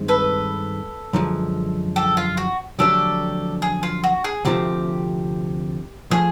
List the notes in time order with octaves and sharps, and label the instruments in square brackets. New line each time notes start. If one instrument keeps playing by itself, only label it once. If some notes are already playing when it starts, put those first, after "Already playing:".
Already playing: [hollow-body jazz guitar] G2 D#3 G#3 C4
[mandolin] A4 B4
[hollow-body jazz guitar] F#2 D3 F3 G#3
[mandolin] G4 A4
F4
F#4
[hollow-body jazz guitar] F2 D3 F#3 A3 D4 [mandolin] G4 A4
[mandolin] G#4
F4
F#4
G#4
[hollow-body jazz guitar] D2 C3 F3 A3 C4 [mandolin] G4
[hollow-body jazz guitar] F3 A3 [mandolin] G#4